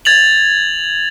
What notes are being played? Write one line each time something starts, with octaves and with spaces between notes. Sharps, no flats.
G#6 A6 F7 F#7